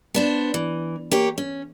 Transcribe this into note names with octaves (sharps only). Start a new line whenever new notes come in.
B3 D4 C5
E3
A#3 G4 C#5
C#4